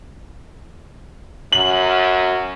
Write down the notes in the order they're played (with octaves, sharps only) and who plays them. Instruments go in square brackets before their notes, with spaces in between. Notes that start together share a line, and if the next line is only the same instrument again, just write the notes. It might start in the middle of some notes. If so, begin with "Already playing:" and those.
[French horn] F#2 [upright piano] F#7